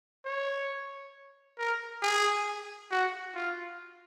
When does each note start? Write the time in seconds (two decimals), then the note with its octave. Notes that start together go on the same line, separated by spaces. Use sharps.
0.25 C#5
1.59 A#4
2.02 G#4
2.91 F#4
3.35 F4